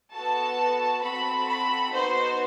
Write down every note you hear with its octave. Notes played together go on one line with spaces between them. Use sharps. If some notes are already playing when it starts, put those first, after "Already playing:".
B3 F#4 A4 A5
C4 F#4 A4 B5
B5
B3 D#4 F#4 C5